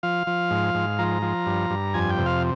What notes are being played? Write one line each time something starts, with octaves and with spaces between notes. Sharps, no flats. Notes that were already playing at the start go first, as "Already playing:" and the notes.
F3 F5
F3
G#2
G#2
F3 A#5
F3
G2
G2
F2 G#5
G5
C3
F5